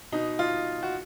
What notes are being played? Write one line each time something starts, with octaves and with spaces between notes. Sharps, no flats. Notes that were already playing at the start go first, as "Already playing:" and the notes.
B2 D#4
F4
F#4